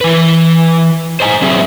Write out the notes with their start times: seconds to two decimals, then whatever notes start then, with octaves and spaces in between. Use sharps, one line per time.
0.01 E3 B4
1.20 C5 D#5 G#5
1.42 F#3 C4 G#4 E5